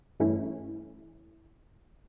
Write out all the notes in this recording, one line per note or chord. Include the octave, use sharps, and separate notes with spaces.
G2 E3 A3 C#4 E4